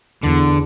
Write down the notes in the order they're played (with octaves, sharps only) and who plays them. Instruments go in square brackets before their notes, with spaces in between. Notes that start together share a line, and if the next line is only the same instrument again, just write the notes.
[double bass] E2 [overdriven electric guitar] D3